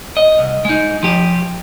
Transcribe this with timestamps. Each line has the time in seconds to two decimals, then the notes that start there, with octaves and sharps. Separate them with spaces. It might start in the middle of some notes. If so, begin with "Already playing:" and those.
0.17 D#5
0.39 C2
0.65 G#3 D#4
1.03 F3 G4